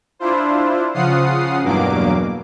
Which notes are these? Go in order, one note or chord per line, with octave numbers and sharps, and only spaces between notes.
D4 E4 F4 C5
C#3 F3 F4 F#5 D#6 C7
E2 G2 B2 F#3 A#3 D6